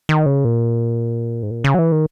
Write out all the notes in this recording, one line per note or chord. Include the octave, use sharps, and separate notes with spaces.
D#3
C#3
A#2
G#2
A#2
C#3
F#3
E3
D#3